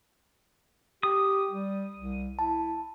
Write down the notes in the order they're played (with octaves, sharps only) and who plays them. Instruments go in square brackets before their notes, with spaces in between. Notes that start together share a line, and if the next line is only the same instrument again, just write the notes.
[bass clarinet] G4 [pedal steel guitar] D#6
[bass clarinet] G3
C2
[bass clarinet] E4 [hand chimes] A5